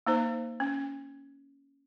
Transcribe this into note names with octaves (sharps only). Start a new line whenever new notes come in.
A#3 D#4 C5
C#4